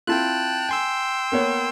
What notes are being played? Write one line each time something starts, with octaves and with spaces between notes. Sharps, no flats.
C4 E4 F4 G5 A5 F#6
G5 G#5 C6 E6
A#3 B3 C#5